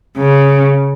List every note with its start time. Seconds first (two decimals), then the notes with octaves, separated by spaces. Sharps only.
0.17 C#3